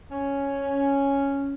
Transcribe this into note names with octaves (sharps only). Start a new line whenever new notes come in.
C#4